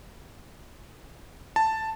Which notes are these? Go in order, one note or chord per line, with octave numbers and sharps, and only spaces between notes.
A5